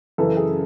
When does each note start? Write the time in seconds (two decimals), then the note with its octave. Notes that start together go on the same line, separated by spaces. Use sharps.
0.18 F#2 C#3 E3 A4
0.37 G#4